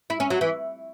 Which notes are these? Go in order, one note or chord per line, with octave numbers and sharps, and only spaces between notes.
E4
C#4
F#3
E3